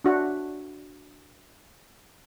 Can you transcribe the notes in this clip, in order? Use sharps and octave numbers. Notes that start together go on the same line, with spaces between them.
D4 F#4 E5